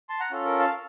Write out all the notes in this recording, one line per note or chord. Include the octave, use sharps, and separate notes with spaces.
A5 C6
F#5 A#5
C#4 F4 A4
A#4
F5 A5